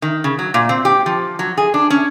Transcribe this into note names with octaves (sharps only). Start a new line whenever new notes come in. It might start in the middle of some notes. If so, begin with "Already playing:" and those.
D#3
C#3
F#3
A#2
C4
G4
F3
F#3
G#4
D4
C#4